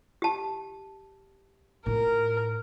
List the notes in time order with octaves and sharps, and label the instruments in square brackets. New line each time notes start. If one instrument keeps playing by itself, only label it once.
[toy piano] G4 A5
[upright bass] A2 F4 [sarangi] A#4